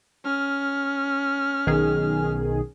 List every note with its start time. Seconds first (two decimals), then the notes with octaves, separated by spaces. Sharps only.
0.25 C#4 F6
1.67 B1 D#3 G#4